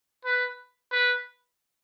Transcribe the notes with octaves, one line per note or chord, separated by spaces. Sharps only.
B4
B4